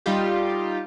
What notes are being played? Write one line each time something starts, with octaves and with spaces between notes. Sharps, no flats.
G3 D#4 F4 G4